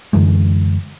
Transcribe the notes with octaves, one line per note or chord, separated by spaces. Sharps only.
F#2 D3 E3 G#3